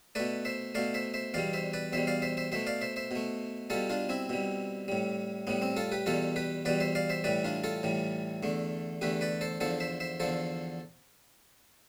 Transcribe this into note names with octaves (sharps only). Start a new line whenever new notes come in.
B2 A3 B4 D5
C5 E5
B2 A3 D5 F5
C5 E5
C5 E5
E2 B2 G3 D5 F5
C5 E5
B4 D5
E2 B2 G3 C5 E5
D5 F5
C5 E5
C5 E5
B2 A3 C5 E5
D5 F5
C5 E5
C5 E5
B2 A3
B2 G3 F4 A4
D4 F4
C4 E4
B2 G3
A2 G3
A2 G3 B3
C4
F4 A4
G4 B4
E2 B2 G3 F4 A4
G4 B4
E2 B2 G3 B4 D5
C5 E5
D5 F5
C5 E5
A2 E3 G3 B4 D5
D4 F4
F4 A4
A2 E3 G3
E2 D3 A3
E2 D3 A3 G4 B4
B4 D5
A4 C5
E2 D3 F3 A4 C5
C5 E5
C5 E5
E2 D3 F3 A4 C5